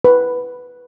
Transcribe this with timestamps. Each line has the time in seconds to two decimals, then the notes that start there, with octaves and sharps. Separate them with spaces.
0.04 B4